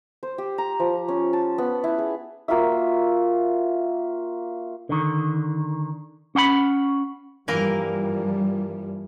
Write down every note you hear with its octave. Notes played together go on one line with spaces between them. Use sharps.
C5
G4
A#5
F3
C#4
A5
B3
E4
G#4
A#3 F4 F#4 E5
D3 D#3
C#4 F#5 G5 B5
G2 E3 F3 G3 A#3 A#4